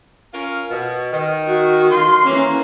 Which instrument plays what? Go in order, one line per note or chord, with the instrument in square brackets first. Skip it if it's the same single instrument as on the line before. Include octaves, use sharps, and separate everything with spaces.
[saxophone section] C#4 F4 A#4
B2
D#3
[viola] F#4
[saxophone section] D#3 F4 [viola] C6
[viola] E3 C#4 [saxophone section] A#3